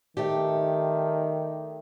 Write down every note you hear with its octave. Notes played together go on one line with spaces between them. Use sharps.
D#3 A3 D4 G4